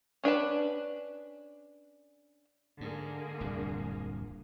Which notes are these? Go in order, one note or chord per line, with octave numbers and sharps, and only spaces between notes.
C#4 D4 B4 A5
G#2 D3 A#3 G#4
D1 C2 F2